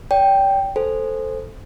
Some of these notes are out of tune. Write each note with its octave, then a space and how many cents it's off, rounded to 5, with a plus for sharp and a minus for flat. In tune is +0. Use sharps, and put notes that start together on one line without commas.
D5 -45 G5 +0
A4 +0 C5 +0 G#5 +0